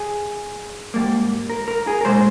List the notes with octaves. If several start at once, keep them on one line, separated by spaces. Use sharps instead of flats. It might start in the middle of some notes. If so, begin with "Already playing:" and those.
Already playing: G#4
G#2 G3 A#3
A#4
A#4
G#4
A#4
A#2 G#3 C5